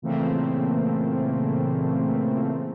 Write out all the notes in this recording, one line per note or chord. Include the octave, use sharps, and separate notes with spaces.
A#2 C#3 E3 A3 A#3 C4